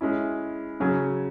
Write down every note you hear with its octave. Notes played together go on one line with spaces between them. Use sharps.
G#3 C#4 E4
C#3 F#3 C#4 G#4